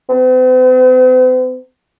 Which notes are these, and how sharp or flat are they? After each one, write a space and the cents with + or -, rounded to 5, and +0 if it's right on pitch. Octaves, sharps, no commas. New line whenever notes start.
C4 -45